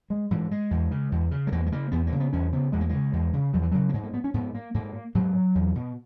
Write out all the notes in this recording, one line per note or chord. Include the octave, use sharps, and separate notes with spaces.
G#3
G#2 E3
G#3
E2
C#3
E2
C#3
G#3
E2 A#3
G#3
C#3 A#3
E2 B3
A#3
C#3
B3
E2 C#4
C#3 B3
E2 G#3
A#3
C#3 G#3
E2
C#3
E2 F#3
E3
C#3 F#3
A#3
G#2 G#3
A#3
B3
C#4
G#2 B3
A#3
G#2 A#3
G#2 F#3
E2
B2